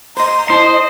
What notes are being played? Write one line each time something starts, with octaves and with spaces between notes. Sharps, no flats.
C5 D#5 A#5 C6
E4 C5 D#5 A5